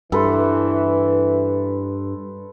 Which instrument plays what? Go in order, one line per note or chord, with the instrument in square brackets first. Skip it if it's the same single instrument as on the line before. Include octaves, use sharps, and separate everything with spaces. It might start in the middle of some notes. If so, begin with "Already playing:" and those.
[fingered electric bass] G2 [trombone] E3 [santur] A4 B4 C5